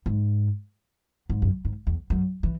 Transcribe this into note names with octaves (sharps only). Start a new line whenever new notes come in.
G#2
G#2
F#2
G#2
E2
F#2
E3